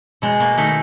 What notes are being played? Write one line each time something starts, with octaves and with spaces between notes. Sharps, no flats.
B2 G#3
B2 A#3
D#3 A3